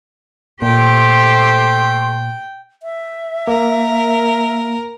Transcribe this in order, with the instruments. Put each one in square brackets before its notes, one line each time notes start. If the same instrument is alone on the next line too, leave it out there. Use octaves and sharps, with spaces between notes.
[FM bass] A#2 [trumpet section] A3 C6 [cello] G4 C5 [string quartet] G5
[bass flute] E5
[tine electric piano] A#3 [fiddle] A#4